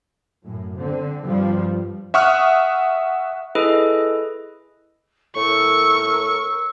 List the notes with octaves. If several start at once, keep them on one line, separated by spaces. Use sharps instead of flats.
F#2 A2
D3 C4
G2 F3 G3
E5 F#5 C#6 D#6 F6 F#6
E4 G#4 A4 B4 D#5
A2 A#4 C#6 E6